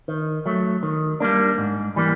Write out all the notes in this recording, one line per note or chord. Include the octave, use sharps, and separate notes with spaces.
D#3
F#3 A3
D#3
G3 A#3 D4
G#2
E3 G3 A#3